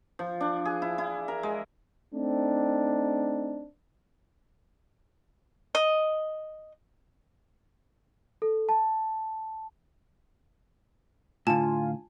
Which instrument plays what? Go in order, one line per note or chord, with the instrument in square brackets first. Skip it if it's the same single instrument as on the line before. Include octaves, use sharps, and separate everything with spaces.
[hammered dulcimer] F3
D4
G#4
E4
E4
A#4
G#3
[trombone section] A3 C4 D4 D#4
[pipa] D#5
[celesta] A4
A5
[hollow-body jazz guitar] A2 D3 [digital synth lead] F4 [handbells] G#5 [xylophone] A5